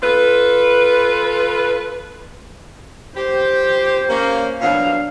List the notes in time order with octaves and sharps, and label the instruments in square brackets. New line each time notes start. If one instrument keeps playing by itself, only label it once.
[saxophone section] F4 A4 B4
[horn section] G4 [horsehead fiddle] C5
[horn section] A#3 C#4
[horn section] B2 F#3 [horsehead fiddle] D4 F5